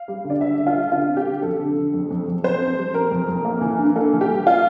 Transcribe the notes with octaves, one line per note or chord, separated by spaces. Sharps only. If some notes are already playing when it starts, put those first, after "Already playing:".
Already playing: F5
G3
D3
D5
D3 E5
D3
F4
G3
D3 F4
C4
G4
D3
F2 A4
D3
D3
F2
F2
F2
F2 C5
C4
G3
C4 A#4
F2
F2
A#3
E3
G2
A#3 A4
E3
G4
G3
F4